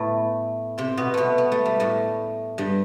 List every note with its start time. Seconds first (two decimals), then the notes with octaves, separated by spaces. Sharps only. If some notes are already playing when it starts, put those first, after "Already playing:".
Already playing: A2 A3 B3
0.78 C3 C4
0.97 B2 B3
1.14 B2 A3 B3
1.38 B3
1.52 A3
1.65 G3
1.80 A2 A3
2.58 G2 G3